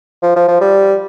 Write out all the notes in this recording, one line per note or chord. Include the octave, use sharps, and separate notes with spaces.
F3
F3
F3
G3